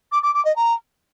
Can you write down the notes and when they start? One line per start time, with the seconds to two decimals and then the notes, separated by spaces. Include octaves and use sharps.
0.12 D6
0.22 D6
0.33 D6
0.44 D#5
0.55 A#5